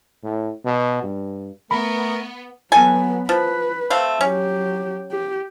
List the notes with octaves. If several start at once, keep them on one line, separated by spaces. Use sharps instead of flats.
A2
B2
G2
A3 B3 A#4 B5
F#3 B3 A4 G#5
F3 B4
A3 C4 F5
F#3 C#4 G4
G4